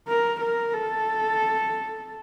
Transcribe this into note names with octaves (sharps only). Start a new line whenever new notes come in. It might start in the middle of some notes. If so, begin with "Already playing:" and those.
A#4
A#4
A4